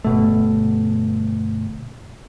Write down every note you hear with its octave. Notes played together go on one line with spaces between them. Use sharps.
G1 B2 A3